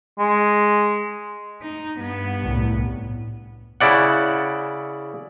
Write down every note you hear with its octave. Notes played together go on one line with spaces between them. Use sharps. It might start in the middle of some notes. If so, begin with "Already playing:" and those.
G#3
D#4
G2 B3
C2 A2
C#3 E4 D5 F#5